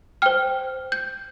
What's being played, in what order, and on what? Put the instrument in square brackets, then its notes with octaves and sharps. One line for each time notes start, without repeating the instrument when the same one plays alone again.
[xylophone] C5 G5 F6
G6